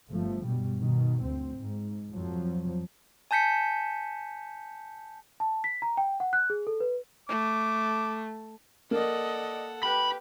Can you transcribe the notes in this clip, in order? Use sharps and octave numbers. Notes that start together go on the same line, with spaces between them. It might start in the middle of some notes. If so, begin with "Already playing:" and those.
G1 F3 A3
G2 B2 G3
B2 D#3
D2 C4
G#2
F2 F3 F#3
G#5 A5 G6 B6 C#7
A5
B6
A#5
G5
F#5
F#6
G#4
A4
B4
A3 D6
A#3 A4 D5 D#5 F#5
G4 B4 B5